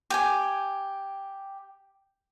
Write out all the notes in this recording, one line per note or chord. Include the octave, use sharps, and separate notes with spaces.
G4 G5 G#5